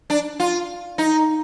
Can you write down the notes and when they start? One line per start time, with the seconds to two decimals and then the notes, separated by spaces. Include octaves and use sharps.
0.10 D4
0.40 F4
0.98 D#4